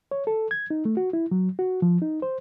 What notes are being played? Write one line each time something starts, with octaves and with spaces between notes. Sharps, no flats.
C#5
A4
G#6
D#4
A3
F#4
E4
F#3
F#4
F3
D#4
C5